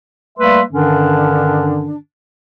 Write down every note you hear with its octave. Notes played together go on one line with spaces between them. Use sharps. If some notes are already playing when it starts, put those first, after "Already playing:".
G3 A3 A#3 B4 E5 C6
G2 D3 D#3 C#4 D4